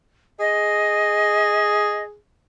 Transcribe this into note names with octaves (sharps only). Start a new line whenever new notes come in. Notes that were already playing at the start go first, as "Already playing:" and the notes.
G#4 D#5